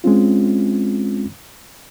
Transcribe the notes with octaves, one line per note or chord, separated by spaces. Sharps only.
G#3 C4 C#4 F4